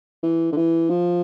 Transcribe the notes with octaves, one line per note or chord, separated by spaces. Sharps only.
E3
D3
E3
F3